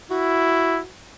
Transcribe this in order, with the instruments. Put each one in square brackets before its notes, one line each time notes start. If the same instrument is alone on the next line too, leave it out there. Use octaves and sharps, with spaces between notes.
[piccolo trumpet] E4 [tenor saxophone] F#4